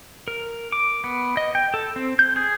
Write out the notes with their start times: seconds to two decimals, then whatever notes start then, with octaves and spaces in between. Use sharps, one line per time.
0.28 A#4
0.72 D6
1.04 B3
1.37 D#5
1.55 G5
1.74 A4
1.96 C4
2.19 G6
2.36 G#4